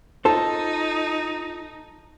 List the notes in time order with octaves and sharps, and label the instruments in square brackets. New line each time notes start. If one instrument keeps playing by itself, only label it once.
[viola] D#4 [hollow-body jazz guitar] F4 A4 C5 [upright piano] A5